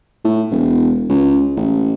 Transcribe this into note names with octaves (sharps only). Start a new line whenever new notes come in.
A2
E1
C#2
A1